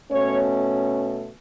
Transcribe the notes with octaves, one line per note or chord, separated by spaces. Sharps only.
B2 A3 C#4 C#5